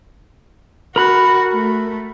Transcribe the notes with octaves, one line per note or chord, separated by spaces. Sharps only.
F#4 A#4 B5 F#6
A3